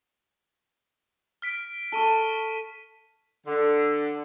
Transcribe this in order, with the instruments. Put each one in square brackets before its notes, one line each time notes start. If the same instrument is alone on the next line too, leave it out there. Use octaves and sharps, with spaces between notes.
[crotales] F6 B6 D7
[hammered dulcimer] A4 [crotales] C#6 D#7 G7
[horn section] D3